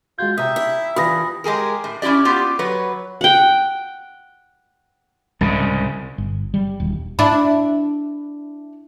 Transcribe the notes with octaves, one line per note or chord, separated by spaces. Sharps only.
G#3 F4 F#4 G6 G#6
C3 E5 G5 A#5 D#6
E4
G2 E3 F4 B5 D#6 A#6
G#3 G4 G#4 A#4
A2
C#4 E4 F#4 G4 D5
B3 F4 G4
F#3 B4 C#5
F#5 G5
C2 G#2 C#3
G1
G3
D#1
D4 E4